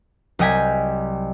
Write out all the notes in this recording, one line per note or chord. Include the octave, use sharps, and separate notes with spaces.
C2 F#3 D#5 G5 G#5 B6